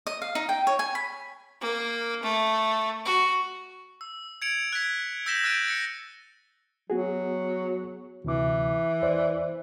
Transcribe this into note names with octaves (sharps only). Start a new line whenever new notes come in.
D#5
F5
D#4
G5
C#5
G#5
B5
A#3
A3
F#4
E6
G#6 C#7 D7 F7 F#7
F#6 G#6 B6 D7
E6 G6 A#6 B6 E7 G7
E6 F#6 A6 A#6 D7 D#7
A#6 C#7
F#3 B3 F#4 G#4
D2 C3 E3 D6
E2 C5 D5